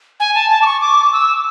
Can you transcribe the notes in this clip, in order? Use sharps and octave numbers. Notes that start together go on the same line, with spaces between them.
G#5
A5
A5
D6
C#6
D6
E6